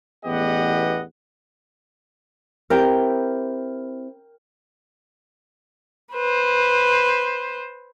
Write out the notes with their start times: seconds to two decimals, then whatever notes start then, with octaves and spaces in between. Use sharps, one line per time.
0.25 A1 E2 B3 G4 D#5 F#5
2.70 C4 E4 G4 A#4 G5
6.13 B4 C5